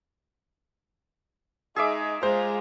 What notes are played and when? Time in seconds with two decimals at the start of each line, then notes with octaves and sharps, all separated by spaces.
1.76 G#3 D#4 G#4 E5 D6
2.23 G#3 F4 C5 A#5